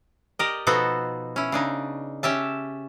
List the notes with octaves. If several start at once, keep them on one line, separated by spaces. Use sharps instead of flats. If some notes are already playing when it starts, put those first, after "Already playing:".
G4 A#4 D5 D#5
B2 F3 B3 D#4 F#4 A4
C#4 E4
C#3 D4 D#4
C#4 G4 E5 A5